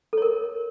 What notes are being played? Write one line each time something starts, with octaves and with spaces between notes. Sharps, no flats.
A4 A#4 C#5